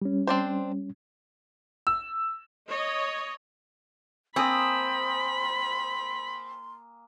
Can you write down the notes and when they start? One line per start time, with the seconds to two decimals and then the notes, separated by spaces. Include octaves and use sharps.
0.02 G3 C#4
0.27 C4 D4 C5
1.87 E6
2.68 C#5 D#5
4.36 A#3 C4 G#5 B5 C6 D#6